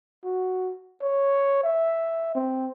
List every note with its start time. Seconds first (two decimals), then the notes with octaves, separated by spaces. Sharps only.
0.25 F#4
1.02 C#5
1.64 E5
2.35 C4